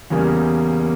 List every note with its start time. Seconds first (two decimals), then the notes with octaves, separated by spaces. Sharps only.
0.10 E2 C#3 G3 A#3
0.80 A#3